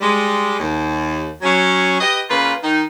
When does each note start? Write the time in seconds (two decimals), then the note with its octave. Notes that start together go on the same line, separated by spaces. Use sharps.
0.01 G3 G#3
0.59 D#2
1.42 F#3 C#4
2.00 G4 B4 D#5
2.30 C#3 A#3 F4 B4
2.63 D#3 D#4